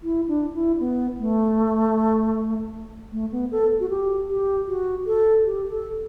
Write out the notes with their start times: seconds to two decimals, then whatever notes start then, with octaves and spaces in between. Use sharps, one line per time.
0.03 E4
0.28 D4
0.54 E4
0.80 B3
1.19 A3
3.12 A3
3.32 B3
3.51 A4
3.80 F#4
3.90 G4
4.29 G4
4.67 F#4
5.07 A4
5.45 G4
5.70 A4